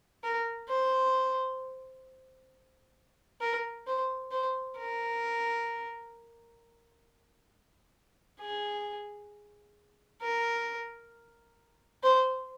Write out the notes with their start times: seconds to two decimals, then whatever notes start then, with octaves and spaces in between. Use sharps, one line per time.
0.23 A#4
0.69 C5
3.41 A#4
3.87 C5
4.31 C5
4.77 A#4
8.40 G#4
10.22 A#4
12.03 C5